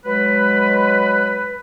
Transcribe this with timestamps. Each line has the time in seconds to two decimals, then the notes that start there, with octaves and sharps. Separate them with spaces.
0.05 F#3 G#3 B4